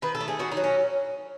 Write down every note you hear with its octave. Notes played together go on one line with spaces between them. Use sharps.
D#3 B4
A4
A3
G#4
D#3 F#4
D#4
F#3
C#4